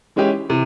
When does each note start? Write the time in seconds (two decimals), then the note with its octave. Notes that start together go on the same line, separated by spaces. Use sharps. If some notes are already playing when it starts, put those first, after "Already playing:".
0.16 E3 G#3 C#4 E4 G4
0.50 C3 E3